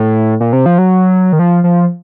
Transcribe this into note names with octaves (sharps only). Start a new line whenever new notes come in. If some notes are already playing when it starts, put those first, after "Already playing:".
Already playing: A2
A#2
C3
F3
F#3
D#3
F3
F3